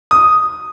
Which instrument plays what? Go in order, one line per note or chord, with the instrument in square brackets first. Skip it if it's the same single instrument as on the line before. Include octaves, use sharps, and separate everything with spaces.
[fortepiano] D#6